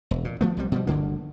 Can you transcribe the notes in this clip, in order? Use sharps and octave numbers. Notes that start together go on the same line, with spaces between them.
E1
A#2
F3 A3 B3
C2 C3 G3
B2 F3 G3
G1 D2 D3 A#3